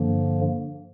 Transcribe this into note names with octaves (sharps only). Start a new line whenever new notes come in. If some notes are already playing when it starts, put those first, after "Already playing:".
Already playing: G2 D3 F3 A#3